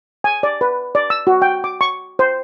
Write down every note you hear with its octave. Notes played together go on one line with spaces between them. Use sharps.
G#5
D5
B4
D5
E6
F#4
G5
D6
C#6
C5